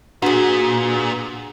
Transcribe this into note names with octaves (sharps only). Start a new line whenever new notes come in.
A#2 B3 D4 F#4 G#4